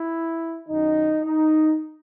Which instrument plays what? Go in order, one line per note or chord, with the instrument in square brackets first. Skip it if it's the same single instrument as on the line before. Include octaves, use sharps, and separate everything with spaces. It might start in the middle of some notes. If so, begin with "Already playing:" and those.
Already playing: [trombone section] E4
F#2 D#3 D#4
D#4